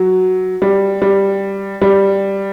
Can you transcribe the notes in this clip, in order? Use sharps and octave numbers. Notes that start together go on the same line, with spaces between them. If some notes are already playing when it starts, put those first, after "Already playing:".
Already playing: F#3
G3
G3
G3